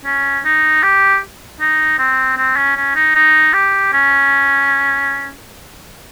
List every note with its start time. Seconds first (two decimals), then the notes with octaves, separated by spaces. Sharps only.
0.05 C#4
0.45 D#4
0.83 G4
1.60 D#4
1.99 C4
2.37 C4
2.56 C#4
2.77 C#4
2.95 D#4
3.15 D#4
3.53 G4
3.93 C#4